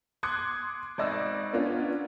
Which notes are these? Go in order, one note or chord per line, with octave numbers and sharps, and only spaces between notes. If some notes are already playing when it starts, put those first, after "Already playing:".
C6 D6 D#6 F#6 G#6 C#7
G#1 D5 D#5 E6
B3 C#4 D4 F4 A#4